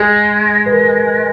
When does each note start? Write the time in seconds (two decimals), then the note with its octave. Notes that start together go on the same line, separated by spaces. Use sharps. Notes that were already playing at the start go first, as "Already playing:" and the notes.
Already playing: G#3 G#4
0.66 B4
0.72 A#4